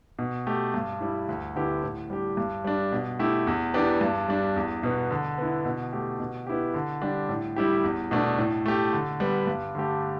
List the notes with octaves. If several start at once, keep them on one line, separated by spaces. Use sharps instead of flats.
B2
A3 G4
G2
G3 E4
D2
D3 B3 E4 G4
A2
G3 D4 G4
G2
G3 D4
B2
A3 E4 G4
E2
E3 B3 D4 G4
G2
G3 D4
E2
B2 B3
D3
B3 E4
B2
A3 G4
B2
B3 E4 G4
D3
G3 D4 G4
A2
G3 E4 G4
E2
B2 A3 D4
A2
A3 G4
D3
G3 B3
G2
D3 A3 G4